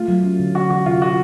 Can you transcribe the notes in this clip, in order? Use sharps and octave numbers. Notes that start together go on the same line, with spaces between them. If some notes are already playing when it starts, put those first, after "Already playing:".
Already playing: A3 F4
F#3
C#4
D3
A3 F#4
E3 F#4
C3 F4
C3 F#4